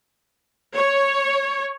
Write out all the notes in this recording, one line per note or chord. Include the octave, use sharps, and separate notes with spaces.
C#5